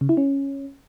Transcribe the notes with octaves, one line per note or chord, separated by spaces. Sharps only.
C#3
E4
C#4